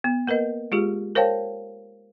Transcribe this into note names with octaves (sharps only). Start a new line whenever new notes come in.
B3
A#3 A#4 B4 D#5
G#3 F4 G4 G#4
A#4 C5 C#5 F5 G5 A5